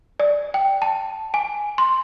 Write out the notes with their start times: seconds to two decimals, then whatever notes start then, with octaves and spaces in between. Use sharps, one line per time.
0.20 D5
0.54 G5
0.82 A5
1.34 G#5
1.78 C6